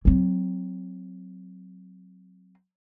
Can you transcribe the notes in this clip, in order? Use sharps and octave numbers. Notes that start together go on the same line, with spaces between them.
F#3 C4